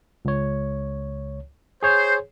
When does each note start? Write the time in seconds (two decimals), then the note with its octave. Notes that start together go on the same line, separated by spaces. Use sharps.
0.25 C#2 C#5
1.83 G#4 C5 C#5